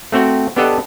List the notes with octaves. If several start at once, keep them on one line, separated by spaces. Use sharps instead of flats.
A3 C4 F#4 G5
B3 D4 G4 A4 D#5 F#5